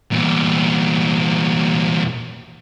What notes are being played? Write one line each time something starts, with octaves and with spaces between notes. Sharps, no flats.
E2 A#2